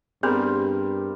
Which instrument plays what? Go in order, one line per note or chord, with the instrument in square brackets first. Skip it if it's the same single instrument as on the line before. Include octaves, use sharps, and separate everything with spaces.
[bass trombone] G2 [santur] G3 A#4 C5 [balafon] B3 C4 G#4